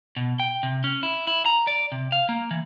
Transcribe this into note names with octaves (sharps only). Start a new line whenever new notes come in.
B2
G5
C3
C#4
E4
E4
A#5
D5
C3
F5
A#3
E3